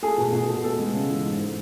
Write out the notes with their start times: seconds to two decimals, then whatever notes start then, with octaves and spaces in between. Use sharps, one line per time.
0.02 A3 G#4
0.18 B2
0.33 B2
0.48 A3
0.64 B3 A4
0.79 G#3
0.94 C#3
1.10 E3
1.24 G#2
1.40 A3